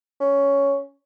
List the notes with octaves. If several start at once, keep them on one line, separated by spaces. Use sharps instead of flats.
C#4